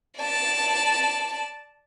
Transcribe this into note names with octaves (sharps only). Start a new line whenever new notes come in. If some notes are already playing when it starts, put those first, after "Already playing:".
D5 A5